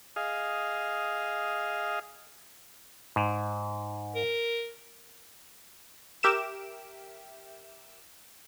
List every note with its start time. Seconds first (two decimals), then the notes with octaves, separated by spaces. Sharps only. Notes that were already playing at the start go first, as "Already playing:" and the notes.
0.16 G#4 D#5 F5
3.16 G#2
4.15 A#4
6.23 G4 A#4 E5 D7 E7